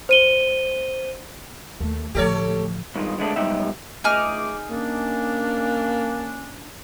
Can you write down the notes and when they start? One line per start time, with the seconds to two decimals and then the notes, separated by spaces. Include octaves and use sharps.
0.09 C5 D#7 G7
1.80 D#2 A3
2.15 A1 D3 F3 A3 G4 A4 C#5
2.95 G2 D#3 G#3 F4
3.18 D3 G#3 A3 D4
3.36 B1 G#2 G3 D#4 G4 E5
4.04 C#2 A3 D#4 G#4 D6 F6
4.70 A#3 C#4 D4